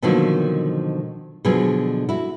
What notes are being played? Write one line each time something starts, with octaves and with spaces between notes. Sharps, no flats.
B2 D3 D#3 F3 F#3 A#3
B2 D3 F3 F#3 G#4
E4 F#4